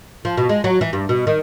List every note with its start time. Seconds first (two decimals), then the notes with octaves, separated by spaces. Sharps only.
0.25 F3
0.38 B2
0.49 G#3
0.64 F#3
0.81 E3
0.93 G2
1.09 B2
1.27 D#3